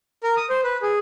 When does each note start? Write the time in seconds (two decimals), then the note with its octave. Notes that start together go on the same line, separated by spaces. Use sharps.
0.24 A#4
0.37 D#6
0.50 C5
0.64 B4
0.82 G#4